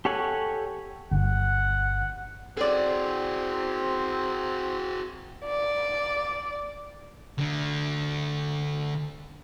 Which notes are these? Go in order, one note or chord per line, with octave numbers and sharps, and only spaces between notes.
G4 A4 C#5 F#5 G#5
G1 F#5
C4 F#4 G#4 A4 D5
D5
D2 D3